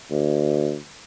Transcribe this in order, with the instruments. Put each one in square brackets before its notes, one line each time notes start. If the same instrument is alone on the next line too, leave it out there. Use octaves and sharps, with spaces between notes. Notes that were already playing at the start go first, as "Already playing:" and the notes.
[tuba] D2